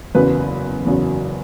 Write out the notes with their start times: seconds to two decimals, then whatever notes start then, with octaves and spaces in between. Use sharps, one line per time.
0.14 F#1 E2 C#3 F#3 B4
0.86 F#1 E2 C#3 F#3